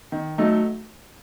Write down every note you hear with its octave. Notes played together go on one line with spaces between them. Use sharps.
D#3
F#3 A3 D#4